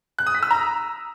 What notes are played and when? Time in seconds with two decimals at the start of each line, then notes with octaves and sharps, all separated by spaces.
0.19 F#6
0.27 D#6
0.35 B6
0.43 E6
0.51 A#5